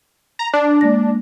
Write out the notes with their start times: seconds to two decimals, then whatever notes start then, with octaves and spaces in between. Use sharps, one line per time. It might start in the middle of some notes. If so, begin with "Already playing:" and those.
0.39 A#5
0.54 D4
0.81 G#3 A#3 A#6